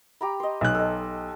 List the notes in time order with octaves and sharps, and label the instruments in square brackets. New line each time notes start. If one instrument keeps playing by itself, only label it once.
[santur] G4 A#5 B5
C5 D#5
[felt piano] B1 F#6
[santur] A4 D#5